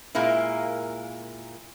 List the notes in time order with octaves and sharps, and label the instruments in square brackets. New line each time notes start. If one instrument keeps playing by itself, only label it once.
[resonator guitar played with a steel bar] A#2 G#3 A#3 E4